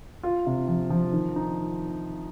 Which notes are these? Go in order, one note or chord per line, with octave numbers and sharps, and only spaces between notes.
F4
C3
F3
F3
D#3
D#4